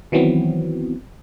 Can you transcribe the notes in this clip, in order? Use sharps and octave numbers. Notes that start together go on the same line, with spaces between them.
D#3 E3 F#3 B3 C4